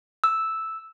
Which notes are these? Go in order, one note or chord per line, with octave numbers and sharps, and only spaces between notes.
E6